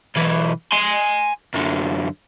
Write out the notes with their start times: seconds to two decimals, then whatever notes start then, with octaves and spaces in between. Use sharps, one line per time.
0.16 B1 E3
0.72 G#5 C6
1.54 F#2 D3